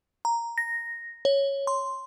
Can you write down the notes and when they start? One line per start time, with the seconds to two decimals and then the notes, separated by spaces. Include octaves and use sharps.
0.25 A#5
0.58 A#6
1.25 C#5
1.67 C6